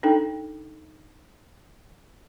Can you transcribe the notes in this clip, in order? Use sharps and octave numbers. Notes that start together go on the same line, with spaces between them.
D4 D#4 A4 G5